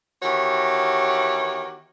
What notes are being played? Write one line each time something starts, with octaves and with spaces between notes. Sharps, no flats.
D#3 E3 B3 F#4 G4 C#5